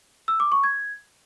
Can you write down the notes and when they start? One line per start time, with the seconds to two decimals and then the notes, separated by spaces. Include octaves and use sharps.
0.28 E6
0.40 D6
0.52 C#6
0.64 G#6